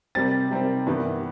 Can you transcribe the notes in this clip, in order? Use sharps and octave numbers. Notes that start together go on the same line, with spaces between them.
C3 G3 C4 A6
C3 G3 C4
G2 E3 G3 B3